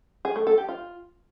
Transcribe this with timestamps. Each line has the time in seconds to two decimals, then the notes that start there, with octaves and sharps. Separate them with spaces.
0.25 G#4
0.36 A3
0.47 A4
0.58 G4
0.69 F4